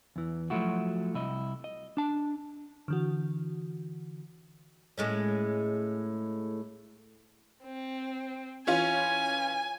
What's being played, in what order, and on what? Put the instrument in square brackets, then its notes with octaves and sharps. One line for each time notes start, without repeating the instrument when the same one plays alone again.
[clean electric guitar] E2 E3
F3 F#3 A3 E4 F#4
C2 E4 D#5
D#5
D4 A5
[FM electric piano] D3 E3 F#4
[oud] A2 G#3 C#4
[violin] C4
[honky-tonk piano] E3 C#4 F4 [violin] G#5